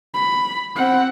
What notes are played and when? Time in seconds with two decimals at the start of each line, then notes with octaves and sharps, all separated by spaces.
0.14 B5
0.76 C4 F#5